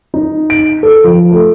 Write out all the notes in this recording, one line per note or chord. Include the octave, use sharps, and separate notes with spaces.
D#4
D7
A4
F3
A3